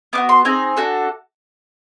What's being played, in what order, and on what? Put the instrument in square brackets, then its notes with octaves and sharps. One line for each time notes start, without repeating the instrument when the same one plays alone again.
[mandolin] B3 D4 F#4 D6
C6
C4 D#4 G#4 G#5
D4 F#4 A4